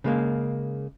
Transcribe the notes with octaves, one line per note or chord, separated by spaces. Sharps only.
C#3 G#3 A#3